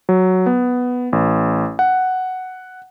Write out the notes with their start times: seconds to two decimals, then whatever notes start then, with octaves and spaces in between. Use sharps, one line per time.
0.09 F#3
0.46 B3
1.13 A1
1.79 F#5